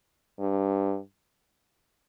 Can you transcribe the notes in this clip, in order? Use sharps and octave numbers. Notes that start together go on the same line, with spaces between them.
G2